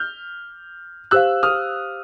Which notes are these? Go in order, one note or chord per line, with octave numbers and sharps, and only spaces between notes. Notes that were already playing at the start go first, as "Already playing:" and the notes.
Already playing: F6 G6
G4 C5 F5 E6 F#6
D#6 F6